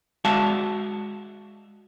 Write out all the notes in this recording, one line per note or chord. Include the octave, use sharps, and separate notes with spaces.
G#3 F#4 D5 E5 F5 A5